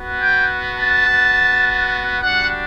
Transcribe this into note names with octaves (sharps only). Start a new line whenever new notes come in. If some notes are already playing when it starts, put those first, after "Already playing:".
Already playing: B3 F#4
G5
A5
B3 F#4
G3 D4 F#4 F#5